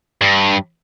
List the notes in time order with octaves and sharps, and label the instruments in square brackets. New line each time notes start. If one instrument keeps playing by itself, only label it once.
[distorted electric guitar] G2